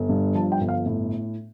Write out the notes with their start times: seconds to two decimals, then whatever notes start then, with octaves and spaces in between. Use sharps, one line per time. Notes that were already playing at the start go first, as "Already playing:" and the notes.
Already playing: G1
0.09 G2
0.35 F3 A5
0.52 G5
0.61 G1
0.69 F5
0.86 A2